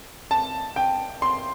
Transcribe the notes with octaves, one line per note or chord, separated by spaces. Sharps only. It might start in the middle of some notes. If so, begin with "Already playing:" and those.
A5
G5
C6